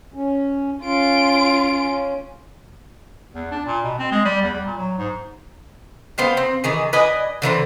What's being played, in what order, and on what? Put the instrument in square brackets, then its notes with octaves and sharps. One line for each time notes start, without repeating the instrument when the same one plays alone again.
[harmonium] C#4
[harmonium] C#4 [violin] F4 D7
[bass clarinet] E2
D4
A#2
B2
C4
G#3
G3
E2
G3
A#2
F#3
G#2
[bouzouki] B3 C5 F5 G5
C4
D#3 E3 G#4
B4 D5 D#5 G#5
D3 E3 B3 C4